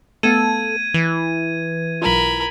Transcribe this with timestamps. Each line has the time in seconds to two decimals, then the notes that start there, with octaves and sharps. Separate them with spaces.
0.23 A3 B3 A4 F5 G#6 D#7
0.94 E3
2.02 B1 F4 A#4 B5